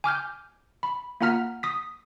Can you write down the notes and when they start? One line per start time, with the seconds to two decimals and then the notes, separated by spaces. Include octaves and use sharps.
0.04 G#5 D6 F6 G6
0.83 B5
1.21 A#3 F4 F#5 A#5 F6 B6
1.63 D#6 B6